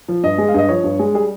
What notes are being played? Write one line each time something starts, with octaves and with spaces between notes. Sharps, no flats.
F3
G2 D#5
G#3
F5
G2 D#5
F3 C#5
G2
G#3
G3 G#4